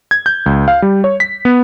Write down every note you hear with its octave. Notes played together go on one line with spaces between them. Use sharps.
G#6
G6
C#2
F5
G3
C#5
B6
B3